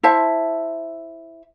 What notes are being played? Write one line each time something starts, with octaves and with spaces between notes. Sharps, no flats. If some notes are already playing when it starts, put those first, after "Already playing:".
E4 C5 E5 A5